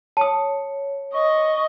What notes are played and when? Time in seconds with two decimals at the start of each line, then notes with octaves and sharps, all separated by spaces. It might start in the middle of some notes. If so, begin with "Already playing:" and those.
0.17 C#5 A5 D#6
1.13 D#5 C#6